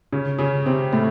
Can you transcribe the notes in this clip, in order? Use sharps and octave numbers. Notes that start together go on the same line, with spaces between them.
C#3 C#4
C#3 C#4
C3 C4
A2 A3